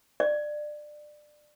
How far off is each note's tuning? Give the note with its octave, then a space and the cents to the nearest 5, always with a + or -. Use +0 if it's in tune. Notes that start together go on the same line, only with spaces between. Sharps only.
D5 +20